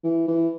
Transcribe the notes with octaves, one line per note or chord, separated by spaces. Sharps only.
E3
E3